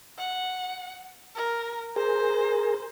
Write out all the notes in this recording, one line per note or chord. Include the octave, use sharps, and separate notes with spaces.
F#5
A#4
G#4 A#4 C5